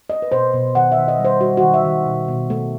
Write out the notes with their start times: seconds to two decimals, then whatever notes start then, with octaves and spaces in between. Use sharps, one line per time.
0.10 A3 D#5
0.22 B4
0.32 B2 C5
0.54 B2
0.75 D#3 F#5
0.92 E5
0.97 D#3
1.08 D#5
1.19 G3
1.25 C5
1.41 G3 F#4
1.57 F#4
1.62 D#3
1.74 E5
1.84 D#3
2.06 B2
2.28 B2
2.50 A3